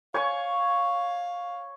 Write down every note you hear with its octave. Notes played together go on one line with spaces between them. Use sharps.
C#5 F5 G#5 C#6